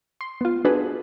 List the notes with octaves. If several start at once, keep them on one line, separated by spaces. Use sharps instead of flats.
C6
B3 F4
D4 F#4 G#4 A4 B4